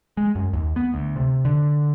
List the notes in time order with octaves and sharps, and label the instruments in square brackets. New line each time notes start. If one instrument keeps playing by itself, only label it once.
[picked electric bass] G#3
F#2
D#2
B3
D2
C3
D3